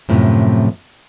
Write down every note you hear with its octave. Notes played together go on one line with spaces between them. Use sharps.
F#2 A2 C3 F3